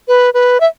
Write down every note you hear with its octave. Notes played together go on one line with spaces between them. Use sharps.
B4
B4
E5